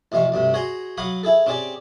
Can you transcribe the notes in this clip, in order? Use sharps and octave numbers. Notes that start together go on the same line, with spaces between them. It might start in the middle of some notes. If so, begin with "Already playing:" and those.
A1 F2 C3 F5 C#6
D2 G2 C3
F#4 G#4 C#5 G#5 A#5 C6
F#3 C#5 F5 F#5 B5 D#6
E4 G#4 A4
C4 C#4 G4 G#4 D5